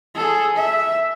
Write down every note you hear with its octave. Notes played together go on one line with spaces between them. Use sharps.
G#4 A4
E5